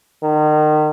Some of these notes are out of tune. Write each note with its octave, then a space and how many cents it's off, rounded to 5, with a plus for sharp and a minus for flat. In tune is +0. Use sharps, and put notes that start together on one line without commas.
D#3 -35